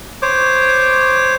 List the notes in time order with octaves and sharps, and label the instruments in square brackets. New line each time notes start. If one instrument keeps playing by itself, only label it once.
[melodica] C5 C#5 D6